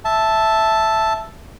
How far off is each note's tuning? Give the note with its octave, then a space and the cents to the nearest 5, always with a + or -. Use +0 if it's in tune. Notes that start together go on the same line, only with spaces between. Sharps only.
E5 +0 A5 +0